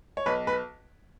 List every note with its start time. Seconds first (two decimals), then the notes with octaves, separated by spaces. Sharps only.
0.17 C#5
0.26 B1 B4
0.47 B4